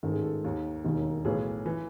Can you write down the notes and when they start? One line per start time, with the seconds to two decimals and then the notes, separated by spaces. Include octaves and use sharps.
0.03 A1 G#2 D#3 A4
0.14 G#4
0.22 A4
0.44 D#2 D#3
0.85 E1 D#2 D#3
1.25 B1 A2 E3 G#4
1.66 E3